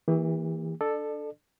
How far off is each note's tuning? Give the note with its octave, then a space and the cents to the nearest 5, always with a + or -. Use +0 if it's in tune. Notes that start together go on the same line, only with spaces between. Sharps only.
E3 -15 A#3 +0 G4 +40
D4 +0 A4 +0 D5 +35